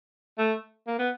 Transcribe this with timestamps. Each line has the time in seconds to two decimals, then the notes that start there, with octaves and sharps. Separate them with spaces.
0.38 A3
0.87 A#3
0.99 B3